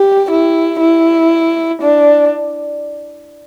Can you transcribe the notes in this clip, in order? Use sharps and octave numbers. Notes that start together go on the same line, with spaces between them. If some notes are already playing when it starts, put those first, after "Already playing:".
Already playing: G4
E4
E4
D4